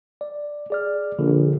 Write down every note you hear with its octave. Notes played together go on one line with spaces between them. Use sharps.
D5
G#4 D5 F6
A#1 D3